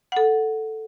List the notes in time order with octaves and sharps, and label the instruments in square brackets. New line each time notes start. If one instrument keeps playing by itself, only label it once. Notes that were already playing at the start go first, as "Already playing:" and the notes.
[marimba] A4 F#5